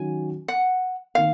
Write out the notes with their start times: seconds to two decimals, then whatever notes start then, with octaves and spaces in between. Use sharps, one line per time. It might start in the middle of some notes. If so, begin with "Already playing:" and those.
Already playing: D#3 F#3 C#4 F#4 G#5
0.48 F#5
1.15 D#3 A#3 F5